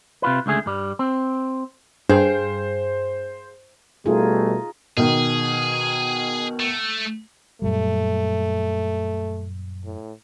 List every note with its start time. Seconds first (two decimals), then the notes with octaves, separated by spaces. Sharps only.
0.22 C3 F4 B4
0.46 C#2 D3 A3 G#4
0.66 G2 G3
0.99 C4
2.09 G2 G#4 C5 F5 G5
4.06 B2 G3 A3 D#4 F4 G#4
4.97 B2 D#3 G#4
6.60 A3
7.62 F#2 A#2 G3 A3
9.85 A2